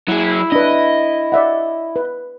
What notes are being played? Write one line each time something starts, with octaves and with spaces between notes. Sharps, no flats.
F#3 E4 G#4
D4 B4 D#5
D5 E5 F#5
B4